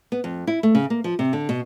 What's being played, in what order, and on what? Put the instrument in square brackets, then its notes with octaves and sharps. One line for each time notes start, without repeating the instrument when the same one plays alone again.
[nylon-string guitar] B3
F2
E4
A3
C#3
A#3
F3
C3
D3
B2